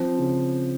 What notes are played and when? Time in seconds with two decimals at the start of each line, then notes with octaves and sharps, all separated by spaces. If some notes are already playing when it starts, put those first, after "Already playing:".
Already playing: F3 C4
0.18 C#3